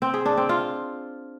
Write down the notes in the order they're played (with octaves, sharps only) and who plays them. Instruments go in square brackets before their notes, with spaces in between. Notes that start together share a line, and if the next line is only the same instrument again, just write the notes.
[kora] C4
G#4
D4
C4
F4